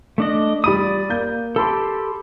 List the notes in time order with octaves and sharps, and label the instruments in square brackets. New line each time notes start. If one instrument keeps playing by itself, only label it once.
[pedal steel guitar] A3 D4 D#5
[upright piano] G3 B5 D#7 [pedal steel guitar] D5 D#6
[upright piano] A#3 G6
[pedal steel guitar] G4 A4 [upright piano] A5 B5 C6